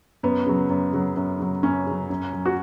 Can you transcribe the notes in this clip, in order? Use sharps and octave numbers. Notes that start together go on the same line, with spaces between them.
F#2 B3
C#3 F#3
F#2
C#3 F#3
F#2
C#3 F#3
F#2 C#4
C#3 F#3
F#2
F#3
F#4